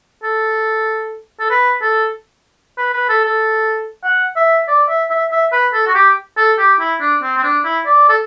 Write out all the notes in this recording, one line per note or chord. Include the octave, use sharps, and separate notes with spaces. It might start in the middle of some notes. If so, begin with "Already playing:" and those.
A4
A4
B4
A4
B4
B4
A4
A4
F#5
E5
D5
E5
E5
E5
B4
A4
F#4
G4
A4
G4
E4
D4
C4
C4
D4
E4
D5
A4